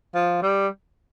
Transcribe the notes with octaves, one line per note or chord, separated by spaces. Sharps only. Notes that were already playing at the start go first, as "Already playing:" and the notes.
F3
G3